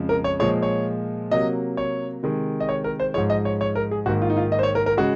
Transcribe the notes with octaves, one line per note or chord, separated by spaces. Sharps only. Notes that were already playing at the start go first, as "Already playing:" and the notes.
Already playing: F2 C#3 F3 G#3
A#4
C#5
A#2 F3 G#3 C#5
C#5
C3 F#3 A#3 D#5
C#5
C3 D#3 G#3
D#5
C#5
A#4
C5
G#2 F3 G#3 C#5
D#5
C#5
C#5
A#4
G#4
G#2 D#3 A#3 F#4
F4
D#4
F4
D#5
C5
C#5
A#4
A#4
C#3 G#3 F#4